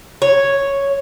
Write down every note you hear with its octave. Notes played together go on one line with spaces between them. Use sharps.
C#5